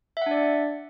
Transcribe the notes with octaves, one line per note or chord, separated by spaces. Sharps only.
D4 D5 E5 F#5